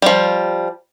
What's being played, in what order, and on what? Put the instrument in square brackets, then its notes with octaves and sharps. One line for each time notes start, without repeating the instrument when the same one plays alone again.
[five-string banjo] F3 G3